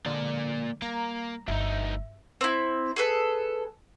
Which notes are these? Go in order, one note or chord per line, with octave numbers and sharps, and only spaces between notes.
D3 F3 G#3 A#3 D5
G3 A#3 A#5
G1 D2 D#4 E5 E6
C4 E4
G#4 A4 B4